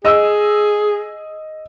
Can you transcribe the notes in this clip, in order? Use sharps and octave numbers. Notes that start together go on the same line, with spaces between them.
G#4 D#5 E6